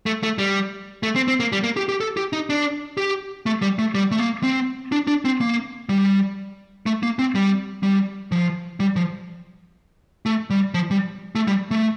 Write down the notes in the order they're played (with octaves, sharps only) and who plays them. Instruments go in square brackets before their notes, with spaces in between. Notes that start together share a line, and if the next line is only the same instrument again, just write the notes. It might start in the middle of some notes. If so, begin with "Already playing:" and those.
[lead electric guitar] A3
A3
G3
A3
C4
C4
A#3
G3
A#3
G4
G4
A4
G4
D#4
D4
G4
A3
G3
A3
G3
A3
A#3
C4
D4
D4
C4
A#3
G3
A3
A#3
C4
G3
G3
F3
G3
F3
A3
G3
F3
G3
A3
G3
A3